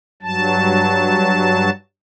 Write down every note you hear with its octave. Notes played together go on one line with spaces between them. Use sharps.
G2 F#3 A5